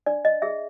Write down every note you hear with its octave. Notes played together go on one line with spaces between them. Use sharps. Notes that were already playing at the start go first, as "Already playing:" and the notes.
D4 D5
D#5
G#4 E5